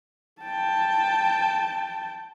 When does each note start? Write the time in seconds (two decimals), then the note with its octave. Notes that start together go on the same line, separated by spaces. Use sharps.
0.42 G5 A5